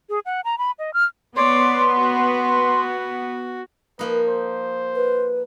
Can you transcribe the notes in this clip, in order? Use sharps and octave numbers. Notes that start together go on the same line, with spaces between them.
G#4
F#5
A#5
B5
D#5
F6
B3 C#5 D5 C6
F#4
F3 A#3 D#4 B4
C5
B4